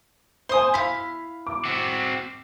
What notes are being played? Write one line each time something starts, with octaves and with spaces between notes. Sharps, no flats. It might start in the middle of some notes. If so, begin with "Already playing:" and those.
C5 G#5 C6 D#6
E4 F5 B6
D6
C4 F#4